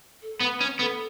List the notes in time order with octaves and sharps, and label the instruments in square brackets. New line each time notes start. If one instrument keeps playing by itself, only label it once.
[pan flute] A4
[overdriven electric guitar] B3 [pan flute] B4
[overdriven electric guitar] C#4
[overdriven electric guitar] B3 [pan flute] A4